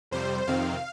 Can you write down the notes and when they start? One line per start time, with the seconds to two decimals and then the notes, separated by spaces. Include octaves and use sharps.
0.11 F2 C3 G3 C5
0.47 F2 C3 D#3 C4 F5